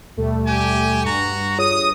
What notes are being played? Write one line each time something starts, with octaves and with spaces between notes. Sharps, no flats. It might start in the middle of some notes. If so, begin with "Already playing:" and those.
D#2 B2 G3 A3
G4 G#5
G2 F#4 A#5 C#6
F4 G#4 C#5 D#6